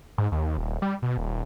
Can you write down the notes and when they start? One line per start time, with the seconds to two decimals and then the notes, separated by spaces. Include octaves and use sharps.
0.18 G#2
0.32 D#2
0.58 D#1
0.82 G3
1.02 B2
1.18 D#1